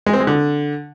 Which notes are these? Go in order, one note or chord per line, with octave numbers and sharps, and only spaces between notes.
G#3
C4
G#3
D3